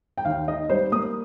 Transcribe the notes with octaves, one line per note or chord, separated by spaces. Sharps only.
G5
D#2 F5
D#3 D#5
G3 C5
A#3 D#6